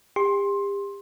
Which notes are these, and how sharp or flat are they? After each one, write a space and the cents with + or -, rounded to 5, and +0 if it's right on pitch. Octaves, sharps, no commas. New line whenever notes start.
G4 +35 C6 +15